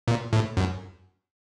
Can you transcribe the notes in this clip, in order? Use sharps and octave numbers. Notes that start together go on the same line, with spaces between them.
A#2
A2
F#2